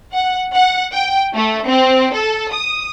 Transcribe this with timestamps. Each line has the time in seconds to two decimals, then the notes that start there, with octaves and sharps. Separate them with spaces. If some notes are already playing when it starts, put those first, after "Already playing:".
0.12 F#5
0.54 F#5
0.93 G5
1.34 A3
1.67 C4
2.14 A4
2.52 D#6